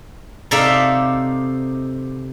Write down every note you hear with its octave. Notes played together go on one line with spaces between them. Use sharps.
C3 D#4 A4 D5 E5 F5